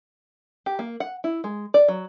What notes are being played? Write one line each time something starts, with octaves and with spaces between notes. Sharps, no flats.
G4
A#3
F#5
E4
G#3
D5
F#3